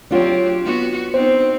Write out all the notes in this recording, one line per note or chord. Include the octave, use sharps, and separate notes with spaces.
F#3 C4 D4 F4 G4 C#5
B3 F#4
B3 C4 D#4 C5